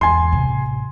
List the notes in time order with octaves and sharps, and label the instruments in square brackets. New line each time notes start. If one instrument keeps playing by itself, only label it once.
[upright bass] E2 G#2 [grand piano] G#5 C6
[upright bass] A1 C3